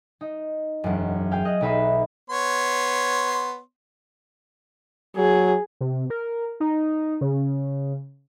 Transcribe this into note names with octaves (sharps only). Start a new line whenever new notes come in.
D#4
E1 F#2
G#4 F5 G5
D#5 F#6
B1 D#4 B4 E5 C6
B3 C#5 C6
F#3 G#4
C3
A#4
D#4
C#3